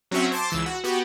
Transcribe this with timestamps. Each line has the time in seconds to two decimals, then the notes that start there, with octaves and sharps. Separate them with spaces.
0.11 F#3 C4 C#4 F#4 C#5 E5
0.32 C5 A5 D6
0.50 C#2 E3 E6
0.66 F#4
0.84 B3 F#4 G4